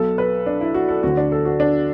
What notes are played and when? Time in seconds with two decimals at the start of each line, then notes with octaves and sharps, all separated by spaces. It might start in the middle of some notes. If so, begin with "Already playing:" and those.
Already playing: B1 B2 A4
0.18 B4
0.46 D4
0.61 E4
0.74 F#4
0.89 A4
1.03 D2 D3 F#4
1.17 D4
1.32 A4
1.45 F#4
1.60 D4